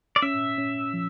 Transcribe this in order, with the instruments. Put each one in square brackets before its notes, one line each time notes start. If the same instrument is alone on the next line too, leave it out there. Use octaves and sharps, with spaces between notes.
[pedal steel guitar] D5
[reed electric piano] C#4 [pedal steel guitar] E5
[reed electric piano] C#4
F3